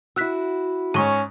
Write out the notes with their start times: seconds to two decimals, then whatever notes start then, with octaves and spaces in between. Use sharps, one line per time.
0.16 E4 F#4 E6 F#6 B6
0.94 G#2 C#4 A#5 C#6 D#7